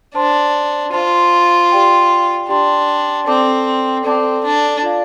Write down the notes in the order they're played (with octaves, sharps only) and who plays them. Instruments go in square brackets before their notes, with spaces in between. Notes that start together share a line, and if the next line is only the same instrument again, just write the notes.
[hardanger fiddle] D4 [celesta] C5 A5 C6
[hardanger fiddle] F4 [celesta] C5 A5 C6
[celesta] G4 D5 G5 C6
[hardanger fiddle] D4 [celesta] G4 D5 G5 C6
[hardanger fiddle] C4 [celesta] A4 D5 A5 D6
[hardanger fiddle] C4 [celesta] A4 D5 A5 D6
[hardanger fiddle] D4
[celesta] F4 D5 F5